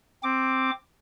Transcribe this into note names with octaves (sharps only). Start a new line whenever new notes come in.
C4 D6